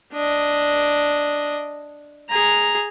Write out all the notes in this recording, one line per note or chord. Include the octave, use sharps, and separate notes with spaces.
D4 D#5
G#4 A#5